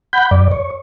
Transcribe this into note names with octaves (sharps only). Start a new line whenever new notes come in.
F#5 B5 G6
F#2 D5
C#5